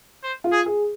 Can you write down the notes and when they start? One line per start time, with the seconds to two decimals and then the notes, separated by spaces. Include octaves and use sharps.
0.23 C5
0.44 F4
0.52 G#4
0.66 G#4